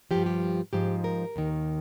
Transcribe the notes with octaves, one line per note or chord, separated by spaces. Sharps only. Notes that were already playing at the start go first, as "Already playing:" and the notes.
G2 F3 G4
G4
G#2 F3 G4
A#4
D#2 D#3